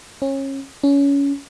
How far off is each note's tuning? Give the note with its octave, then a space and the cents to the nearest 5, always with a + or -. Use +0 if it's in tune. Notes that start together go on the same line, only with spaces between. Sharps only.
C#4 -30
C#4 +20